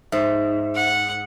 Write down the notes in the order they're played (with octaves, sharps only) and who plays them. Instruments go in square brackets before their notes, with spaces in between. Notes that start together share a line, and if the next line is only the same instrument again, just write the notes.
[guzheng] G#2 [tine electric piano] C5 E5
[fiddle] F#5